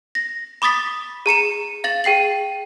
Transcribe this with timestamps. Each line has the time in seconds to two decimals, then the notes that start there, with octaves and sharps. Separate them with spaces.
0.15 A#6
0.62 B5 D6 D#6 A6 B6
1.26 G#4 A#5 C#7 E7
1.84 F5 A6 F#7
2.04 G#4 G5 C7 F#7